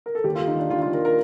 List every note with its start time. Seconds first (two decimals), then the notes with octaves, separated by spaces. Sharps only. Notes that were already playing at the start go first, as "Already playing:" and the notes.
0.06 A#4
0.15 A4
0.24 D#2 G4
0.35 F4
0.40 D#2
0.47 D#4
0.55 D#3 D4
0.70 D#3 F4
0.82 F4
0.86 D#2
0.93 A#4
1.05 A#4